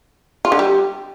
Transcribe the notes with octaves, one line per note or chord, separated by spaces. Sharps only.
F4
D3
G3